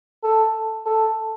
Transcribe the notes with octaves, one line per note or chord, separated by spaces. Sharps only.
A4
A4